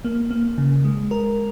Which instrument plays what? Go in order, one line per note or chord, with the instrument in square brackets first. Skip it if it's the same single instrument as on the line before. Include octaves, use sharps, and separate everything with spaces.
[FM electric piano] A#3
A#3
C#3
G#3
A#4